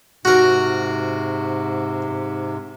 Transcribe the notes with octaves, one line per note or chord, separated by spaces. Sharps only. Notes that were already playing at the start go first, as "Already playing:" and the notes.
G#2 C3 F#4 A#4